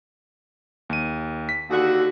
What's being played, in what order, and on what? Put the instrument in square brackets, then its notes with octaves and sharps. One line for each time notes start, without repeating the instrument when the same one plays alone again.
[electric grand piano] D#2 D#7
B6
[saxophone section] D#2 D3 F#4